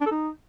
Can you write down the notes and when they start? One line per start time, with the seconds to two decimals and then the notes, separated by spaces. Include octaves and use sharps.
0.01 D4
0.06 A4
0.11 D#4